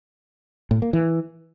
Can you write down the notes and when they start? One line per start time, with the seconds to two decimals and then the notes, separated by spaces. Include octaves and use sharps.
0.71 A2
0.82 A#3
0.93 E3